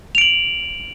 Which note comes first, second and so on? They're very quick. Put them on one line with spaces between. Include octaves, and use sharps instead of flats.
F7 D7 F#7